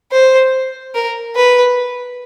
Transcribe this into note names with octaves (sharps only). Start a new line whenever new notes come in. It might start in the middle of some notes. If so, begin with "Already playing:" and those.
C5
A#4
B4